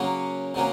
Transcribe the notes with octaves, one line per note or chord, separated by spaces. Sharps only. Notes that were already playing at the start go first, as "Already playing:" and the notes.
Already playing: C#3 F#3 A#3 C#4
C#3 F#3 A#3 C#4